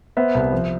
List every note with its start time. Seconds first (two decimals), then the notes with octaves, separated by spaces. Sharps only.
0.17 B3 C5 E5
0.35 C2
0.52 F3